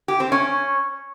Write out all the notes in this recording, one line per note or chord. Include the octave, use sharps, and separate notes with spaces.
G4
C4
C#4